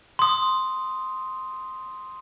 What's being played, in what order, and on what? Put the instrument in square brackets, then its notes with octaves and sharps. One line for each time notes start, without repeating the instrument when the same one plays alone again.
[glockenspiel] C6 D#6